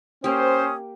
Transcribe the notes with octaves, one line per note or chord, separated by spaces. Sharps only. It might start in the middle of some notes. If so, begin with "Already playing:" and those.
A#3 C#4 G4 C5 D#6